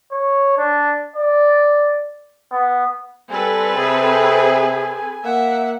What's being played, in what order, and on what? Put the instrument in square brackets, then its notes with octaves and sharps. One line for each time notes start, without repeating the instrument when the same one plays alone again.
[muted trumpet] C#5
D4
D5
B3
[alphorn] G3 [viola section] C4 A4 B4 [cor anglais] G#5
[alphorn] C3 [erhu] G#4
[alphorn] A#3 [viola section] E5 [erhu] F#5